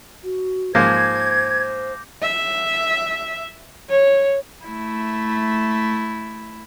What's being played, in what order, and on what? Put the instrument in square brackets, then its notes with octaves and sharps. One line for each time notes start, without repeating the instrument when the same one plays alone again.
[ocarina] F#4
[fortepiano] G#2 F3 A#3 [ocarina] C5 [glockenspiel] D6 G6 A#6 [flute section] G#6
[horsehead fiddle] E5
C#5
[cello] A3 E4